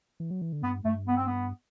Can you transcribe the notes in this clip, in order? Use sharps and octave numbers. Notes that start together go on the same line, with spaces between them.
E3
F#3
E3
D3
G2 B3
G2 A3
B3
C4
B3